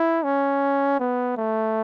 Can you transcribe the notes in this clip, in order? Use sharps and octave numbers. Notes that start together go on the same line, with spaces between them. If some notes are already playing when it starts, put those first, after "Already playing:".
Already playing: E4
C#4
B3
A3